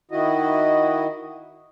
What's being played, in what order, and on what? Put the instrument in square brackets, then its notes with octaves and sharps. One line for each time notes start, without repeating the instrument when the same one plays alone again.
[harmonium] D#3 E4 F#4 D#5